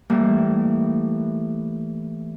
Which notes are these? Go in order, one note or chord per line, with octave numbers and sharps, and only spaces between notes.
A2 E3 G3 A#3